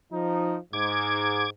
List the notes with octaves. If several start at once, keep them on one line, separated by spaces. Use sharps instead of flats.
F3 D#4
G#2 D6 G#6